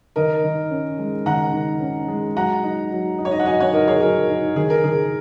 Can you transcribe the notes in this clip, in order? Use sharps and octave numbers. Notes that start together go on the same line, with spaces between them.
D#3 A#4 D#5
D#3
C#4
G#3
D#3 F#5 A#5
D#3
C#4
G#3
F#3 F#5 A#5
D#4
F#3
D#4
C#5
D#5
F#5
F#3 D#5 G#5
C#5 F#5
D#4 A#4 D#5
G#4 C#5
F#3 A#4
D#4
D#3 G#4
A#4
D#3 G#4